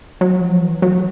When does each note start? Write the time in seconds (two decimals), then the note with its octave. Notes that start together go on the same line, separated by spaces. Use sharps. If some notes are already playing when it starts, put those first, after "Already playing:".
0.21 F#3
0.41 F3
0.62 E3
0.82 F#3